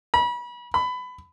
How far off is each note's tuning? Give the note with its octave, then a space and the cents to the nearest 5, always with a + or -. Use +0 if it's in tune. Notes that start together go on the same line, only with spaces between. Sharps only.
B5 -35
B5 +20